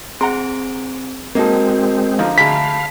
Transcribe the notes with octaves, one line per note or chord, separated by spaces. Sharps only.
C4 G#4 F#5 A#5 C6 D7
G#3 A#3 C4 D#4 F#4 A4 A#4
D3 F3 D#4 F5 A#5
D2 G#3 F5 A5 B5 B6